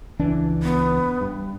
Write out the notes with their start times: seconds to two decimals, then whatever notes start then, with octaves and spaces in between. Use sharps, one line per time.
0.19 C#2 E3 D4
0.63 B3
1.21 G2